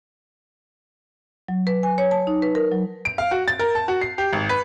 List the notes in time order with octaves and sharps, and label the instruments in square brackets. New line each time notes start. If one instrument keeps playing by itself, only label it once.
[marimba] F#3
B4
G#5
C#5
A5
D#4
B4
A#4
F#3
[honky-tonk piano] D7
F5
F#4
A6
A#4
A5
F#4
C7
G4
G#1
B4